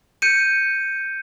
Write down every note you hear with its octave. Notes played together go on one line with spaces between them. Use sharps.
G6 C#7 D#7